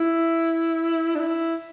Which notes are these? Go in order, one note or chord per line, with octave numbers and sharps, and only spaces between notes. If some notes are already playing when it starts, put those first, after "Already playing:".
Already playing: E4
D4
E4